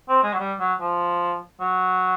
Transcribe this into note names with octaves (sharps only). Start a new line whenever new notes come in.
C4
G#3
F#3
G3
F#3
F3
F#3